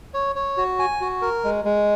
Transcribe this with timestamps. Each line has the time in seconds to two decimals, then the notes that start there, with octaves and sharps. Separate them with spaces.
0.14 C#5
0.36 C#5
0.57 F#4
0.79 G#5
1.01 F#4
1.22 A#4
1.44 G#3
1.65 G#3